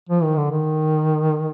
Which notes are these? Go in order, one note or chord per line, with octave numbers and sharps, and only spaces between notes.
F3
D#3
D3
D#3